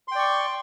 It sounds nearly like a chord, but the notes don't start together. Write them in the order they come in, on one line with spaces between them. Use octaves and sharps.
C6 G5 D5 C#6